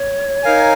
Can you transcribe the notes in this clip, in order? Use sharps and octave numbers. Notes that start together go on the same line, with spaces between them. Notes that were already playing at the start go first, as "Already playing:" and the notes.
Already playing: C#5
D#4 A#4 F5 G#5